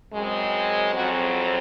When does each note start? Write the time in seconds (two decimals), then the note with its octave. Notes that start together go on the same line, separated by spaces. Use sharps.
0.12 F#2 C#3 G#3 C4
0.94 F2 C#3 F#3 C4 F#4